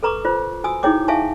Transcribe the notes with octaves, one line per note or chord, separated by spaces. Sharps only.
A4 B4 A#5 C#6 D6
F4 C5
F#4 G#5 D#6 E6
D#4 E4 G#4 C#5 G5 D6
E5 F5 G#5 A5 C#6